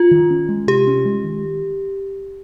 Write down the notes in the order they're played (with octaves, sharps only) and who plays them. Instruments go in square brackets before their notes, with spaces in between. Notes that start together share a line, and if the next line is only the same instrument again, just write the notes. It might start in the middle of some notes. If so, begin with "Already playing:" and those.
Already playing: [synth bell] F4
[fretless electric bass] D#3
C#4
G#3
[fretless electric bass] C3 [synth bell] G4
[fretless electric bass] C#4
G#3
D#3